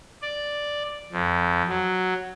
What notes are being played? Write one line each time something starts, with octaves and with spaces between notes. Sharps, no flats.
D5
F2
F#3